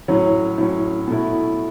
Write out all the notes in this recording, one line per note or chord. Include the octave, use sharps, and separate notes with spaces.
A2 F#3 C#4
A2 F#3 C#4
B2 A3 E4